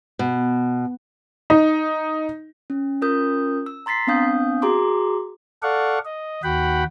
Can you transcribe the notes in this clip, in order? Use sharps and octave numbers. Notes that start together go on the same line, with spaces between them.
B2
D#4
C#4
C#4 F4 A#4 D#6 G6
E6
A#5 C6 A6 B6 C7
B3 C4 D4 F5 D#6 G6
F#4 G#4 A#5 C6 D6
A4 D5 F5 F#5 C#6
D#5
D#2 F#4 F#5 G5 B5